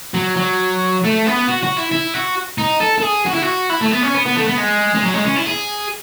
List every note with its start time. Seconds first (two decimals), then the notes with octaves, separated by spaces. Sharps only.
0.14 F#3
0.37 F#3
1.04 A3
1.26 B3
1.47 F#4
1.63 F#4
1.77 E4
1.91 E4
2.14 F#4
2.58 D#4
2.80 A4
2.99 A4
3.02 G#4
3.26 F#4
3.34 E4
3.42 F#4
3.70 E4
3.81 A3
3.91 B3
4.02 C#4
4.14 B3
4.26 B3
4.36 A3
4.48 B3
4.58 G#3
4.95 G#3
5.02 F#3
5.14 G#3
5.24 C#4
5.36 E4
5.47 G#4